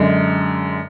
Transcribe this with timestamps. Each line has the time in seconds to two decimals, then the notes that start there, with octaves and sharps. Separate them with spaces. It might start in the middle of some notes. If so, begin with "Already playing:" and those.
Already playing: F#2 D3 G#3